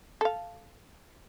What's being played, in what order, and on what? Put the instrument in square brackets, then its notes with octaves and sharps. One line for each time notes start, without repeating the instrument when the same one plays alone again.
[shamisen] A4 F5